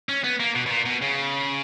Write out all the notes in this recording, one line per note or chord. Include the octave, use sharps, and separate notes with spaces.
C#4
B3
A#3
B2
B2
A#2
B2
C#3